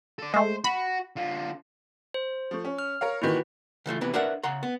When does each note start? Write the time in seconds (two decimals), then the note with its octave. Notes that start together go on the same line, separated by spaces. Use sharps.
0.19 A4 D5
0.34 G#3 A3 C5
0.64 F#4 B5
1.16 D3 F4
2.14 C5
2.51 F3 A3
2.65 C#4
2.79 F6
3.01 A#4 C#5 F5
3.22 A#2 D#3 E3 E4 F#4 B4
3.86 C#3 E3 A3 F4
4.01 C3 E3 B3 B4
4.14 D4 A#4 B4 E5 F#5
4.43 C#3 F#5 A#5 C6
4.63 B3